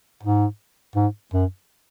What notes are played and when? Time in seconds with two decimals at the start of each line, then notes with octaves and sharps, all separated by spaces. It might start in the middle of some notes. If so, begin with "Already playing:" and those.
0.23 G#2
0.96 G#2
1.33 F#2